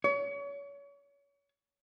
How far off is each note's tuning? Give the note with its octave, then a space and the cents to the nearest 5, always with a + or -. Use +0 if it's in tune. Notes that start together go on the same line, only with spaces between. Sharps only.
C#5 +35